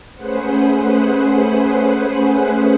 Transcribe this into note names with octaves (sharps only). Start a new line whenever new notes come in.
A3 C#4 G#4 B4 C5 F#5